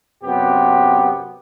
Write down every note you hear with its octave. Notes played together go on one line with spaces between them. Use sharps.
F#2 C3 B3 G4